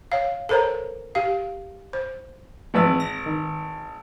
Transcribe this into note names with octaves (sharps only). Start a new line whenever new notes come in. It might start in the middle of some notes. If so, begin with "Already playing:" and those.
C#5 F5
A4 A#4 C5 C#5 A#5
G4 F5
C5
G#1 E3 F3 C4 B4 E6
A#6
D#3